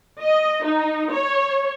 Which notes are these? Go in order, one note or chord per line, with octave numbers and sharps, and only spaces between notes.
D#5
D#4
C#5